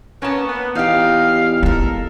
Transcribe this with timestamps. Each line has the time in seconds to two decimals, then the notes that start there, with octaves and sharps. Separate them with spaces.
0.22 A#3 B3 C#4 A5
0.47 B3
0.75 E2 D#4 G4 F5
1.63 A#3 A4 A#4